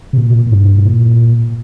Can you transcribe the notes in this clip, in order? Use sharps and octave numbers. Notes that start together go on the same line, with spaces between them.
C3
A#2
A#2
G2
A#2